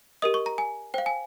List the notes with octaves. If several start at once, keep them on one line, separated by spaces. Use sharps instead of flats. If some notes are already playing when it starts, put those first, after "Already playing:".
G4 A#4 D#5 D#6
C#6
A#5
G#5
C5 F5 G5
G#5